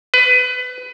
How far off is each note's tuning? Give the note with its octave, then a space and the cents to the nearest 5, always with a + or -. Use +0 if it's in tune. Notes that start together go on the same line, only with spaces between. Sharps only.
B4 +25